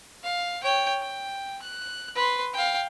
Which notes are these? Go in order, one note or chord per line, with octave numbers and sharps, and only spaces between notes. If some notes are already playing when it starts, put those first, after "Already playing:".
F5
C#5 G5
G5
F#6
B4 C6
F5 G5